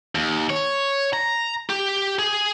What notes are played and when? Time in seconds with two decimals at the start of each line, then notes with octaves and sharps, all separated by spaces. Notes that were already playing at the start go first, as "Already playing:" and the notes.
0.15 D#2
0.50 C#5
1.13 A#5
1.70 G4
2.19 G#4